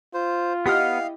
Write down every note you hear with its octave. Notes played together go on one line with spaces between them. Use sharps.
F4 C5
B3 E4 G4 D#5 F5 F#5 F6